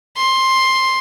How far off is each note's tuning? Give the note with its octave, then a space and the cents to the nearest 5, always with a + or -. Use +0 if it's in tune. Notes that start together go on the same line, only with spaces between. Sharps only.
C6 +10